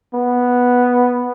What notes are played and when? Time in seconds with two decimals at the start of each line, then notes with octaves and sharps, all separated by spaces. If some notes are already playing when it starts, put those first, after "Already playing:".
0.14 B3